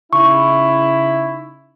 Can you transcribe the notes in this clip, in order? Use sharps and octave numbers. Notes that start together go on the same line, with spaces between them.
C#3 D#4 E4 C#6